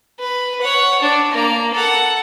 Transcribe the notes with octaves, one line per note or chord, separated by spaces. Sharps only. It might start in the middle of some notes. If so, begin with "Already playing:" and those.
B4
C#5 F#5
D4
A#3 A#5
A4 F#5